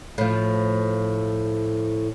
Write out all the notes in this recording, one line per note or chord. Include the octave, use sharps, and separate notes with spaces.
A2 F3